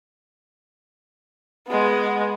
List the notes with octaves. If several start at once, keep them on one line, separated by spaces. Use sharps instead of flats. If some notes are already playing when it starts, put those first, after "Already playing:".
G#3 B3